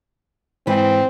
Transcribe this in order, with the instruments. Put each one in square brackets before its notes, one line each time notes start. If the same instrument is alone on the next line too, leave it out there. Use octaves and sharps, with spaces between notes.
[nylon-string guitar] G#2 E3 [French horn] C4